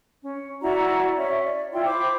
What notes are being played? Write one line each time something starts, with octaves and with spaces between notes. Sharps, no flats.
C#4
E4 F#4 D5 A#5
C#4 E5
D5
E4 F4 G5 C6
C5 B5 D6